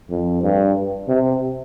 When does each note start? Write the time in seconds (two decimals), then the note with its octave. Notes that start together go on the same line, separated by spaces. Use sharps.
0.10 F2
0.43 G2
1.08 C3